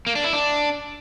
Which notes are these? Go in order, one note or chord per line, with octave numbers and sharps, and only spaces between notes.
A#3
D4
E4
D4